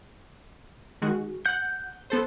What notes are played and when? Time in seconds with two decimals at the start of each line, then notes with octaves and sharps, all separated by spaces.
1.02 D#3 G#3 F#4
1.46 F#5 G6
2.10 B3 A4 C5